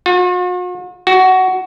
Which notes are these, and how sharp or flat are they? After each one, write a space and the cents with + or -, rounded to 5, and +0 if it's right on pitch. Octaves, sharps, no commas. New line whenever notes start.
F#4 -45
F#4 +15